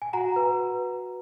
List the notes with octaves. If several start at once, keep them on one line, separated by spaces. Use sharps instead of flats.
G#5
F#4 F#5 A#5
B4